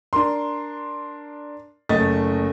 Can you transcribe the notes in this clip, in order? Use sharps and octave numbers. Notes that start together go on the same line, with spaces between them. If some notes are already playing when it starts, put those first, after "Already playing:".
D4 A#4 C6
F#1 A3 D#5 A6